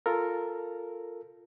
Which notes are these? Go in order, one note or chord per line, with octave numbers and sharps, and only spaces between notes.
F4 A4 A#4